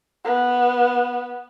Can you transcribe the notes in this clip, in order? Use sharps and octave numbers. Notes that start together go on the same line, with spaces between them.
B3